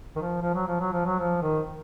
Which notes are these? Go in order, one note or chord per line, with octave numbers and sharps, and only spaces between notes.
D#3
F3
F3
F#3
F3
F#3
F3
F#3
F3
D#3